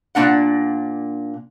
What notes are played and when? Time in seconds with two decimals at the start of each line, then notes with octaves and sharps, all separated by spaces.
0.15 A#2 A#3 D4 F#5